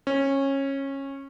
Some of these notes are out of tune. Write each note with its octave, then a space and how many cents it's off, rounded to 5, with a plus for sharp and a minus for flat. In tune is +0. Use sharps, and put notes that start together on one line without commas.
C#4 -20